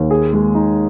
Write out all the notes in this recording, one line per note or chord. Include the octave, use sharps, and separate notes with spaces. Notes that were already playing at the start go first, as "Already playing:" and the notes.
Already playing: D#2
G#4
G#3
D#4